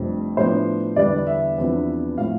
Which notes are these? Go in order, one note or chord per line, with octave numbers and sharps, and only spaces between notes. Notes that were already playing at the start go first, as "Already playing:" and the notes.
Already playing: F1 F2 C3 G3 D4
A2 F3 B3 D4 C5
E2 D3 G3 B3 D4 D5
E5
E2 C3 F3 B3 D4
A2 F3 F5